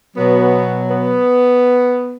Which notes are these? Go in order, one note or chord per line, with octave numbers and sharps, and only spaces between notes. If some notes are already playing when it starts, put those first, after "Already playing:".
B2 F#3 B3
B3